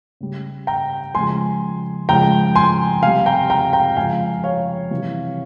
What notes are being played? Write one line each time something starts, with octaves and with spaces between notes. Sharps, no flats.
C#3 G3
G5 A#5
C#3 F3 G#3 G#5 C6
C#3 F3 G#3 G5 A#5
G#5 C6
C3 G3 F5 G#5
G5 A#5
G5 A#5
G5 A#5
C#3 F3 G#3 F5 G#5
C#5 F5
C3 E3 G3